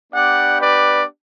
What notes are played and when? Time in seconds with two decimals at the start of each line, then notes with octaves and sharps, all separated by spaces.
0.13 B3 D4 G4 D5 F#5
0.59 B4 D5